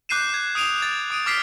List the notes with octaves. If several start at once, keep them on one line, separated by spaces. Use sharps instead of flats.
D6 F#6 G6 C7 D#7 E7
G#6
D#6 C7 D7 D#7 F7
G#6 A6
D#6 D7 D#7
D6 F6 A6 B6 C7 D7